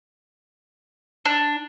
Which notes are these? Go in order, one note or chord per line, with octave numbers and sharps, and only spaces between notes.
D4